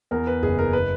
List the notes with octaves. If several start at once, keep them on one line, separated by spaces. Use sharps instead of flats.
E2 A#4
B4
F#1 G#4
A#4
B4